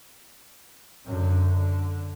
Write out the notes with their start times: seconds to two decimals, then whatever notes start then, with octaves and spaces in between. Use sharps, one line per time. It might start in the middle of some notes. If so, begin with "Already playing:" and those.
1.05 F#2 D3
1.56 D3